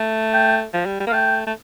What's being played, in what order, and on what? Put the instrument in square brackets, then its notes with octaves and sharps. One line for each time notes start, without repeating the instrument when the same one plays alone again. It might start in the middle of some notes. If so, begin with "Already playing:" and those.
Already playing: [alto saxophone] A3
[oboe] G5
[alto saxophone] F3
G3
G3
[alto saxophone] A#3 [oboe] F5
[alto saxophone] A3 [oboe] G5
[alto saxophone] A3